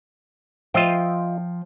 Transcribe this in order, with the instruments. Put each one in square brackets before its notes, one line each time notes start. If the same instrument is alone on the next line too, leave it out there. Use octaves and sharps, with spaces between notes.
[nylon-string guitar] F3 G5 [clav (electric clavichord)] F4 D#5 E5